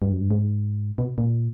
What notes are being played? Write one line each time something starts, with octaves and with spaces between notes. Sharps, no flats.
G2
F#2
G2
G#2
B2
A#2